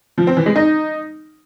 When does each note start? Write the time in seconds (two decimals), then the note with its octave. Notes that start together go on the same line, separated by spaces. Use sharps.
0.18 F3
0.27 C4
0.37 E3
0.46 G#3
0.56 D#4